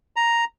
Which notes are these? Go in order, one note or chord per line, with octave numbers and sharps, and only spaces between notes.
A#5